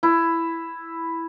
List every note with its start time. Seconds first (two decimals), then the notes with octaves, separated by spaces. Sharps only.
0.03 E4